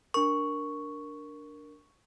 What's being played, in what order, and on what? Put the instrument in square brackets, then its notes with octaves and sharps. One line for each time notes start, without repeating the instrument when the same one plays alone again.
[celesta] D4 A#4 [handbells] C#6